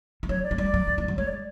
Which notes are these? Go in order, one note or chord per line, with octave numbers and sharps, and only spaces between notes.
G3
F#3 C#5
D5
G#3
G3 D5
F#3
F3
E3
F#3
G#3 C#5
D5